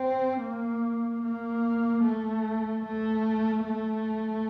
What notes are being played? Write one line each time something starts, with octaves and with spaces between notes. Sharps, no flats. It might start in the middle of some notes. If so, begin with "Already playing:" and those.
Already playing: C4
A#3
A#3
A3
A3
A3